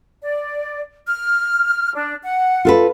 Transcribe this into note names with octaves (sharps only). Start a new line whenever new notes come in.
D5
F6
D4
F#5
F4 A4 B4